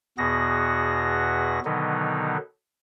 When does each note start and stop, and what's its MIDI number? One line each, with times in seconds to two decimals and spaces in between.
0.18 1.60 40
0.18 1.60 47
0.18 1.60 59
0.18 1.60 66
0.18 1.60 68
0.18 1.60 94
1.65 2.37 47
1.65 2.37 50
1.65 2.37 51
1.65 2.37 54
1.65 2.37 59
1.65 2.37 63